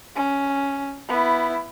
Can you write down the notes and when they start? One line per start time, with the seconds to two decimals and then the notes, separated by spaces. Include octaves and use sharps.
0.16 C#4
1.09 B3 E4